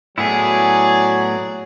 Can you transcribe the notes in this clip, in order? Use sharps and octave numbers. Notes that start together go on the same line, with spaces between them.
A2 F#3 B3 E4 G#4 D5